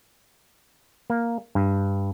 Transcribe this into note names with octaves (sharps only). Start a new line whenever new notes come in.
A#3
G2